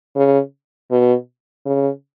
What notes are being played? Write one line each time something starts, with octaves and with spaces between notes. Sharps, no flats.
C#3
B2
C#3